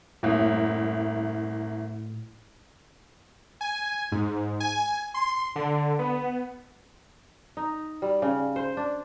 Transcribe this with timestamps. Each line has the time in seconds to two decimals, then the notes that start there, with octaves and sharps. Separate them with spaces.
0.23 F#1 C2 A2
3.61 G#5
4.12 G#2
4.60 G#5
5.14 C6
5.56 D3
5.99 B3
7.57 D#4
8.02 G3
8.22 C#3
8.56 C5
8.77 D4